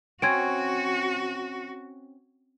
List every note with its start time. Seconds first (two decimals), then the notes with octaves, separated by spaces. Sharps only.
0.22 C4 C#4 F#4 G#6 D7